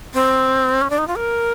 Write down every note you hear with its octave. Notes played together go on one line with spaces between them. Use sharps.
C4
C#4
D4
D#4
F4
A#4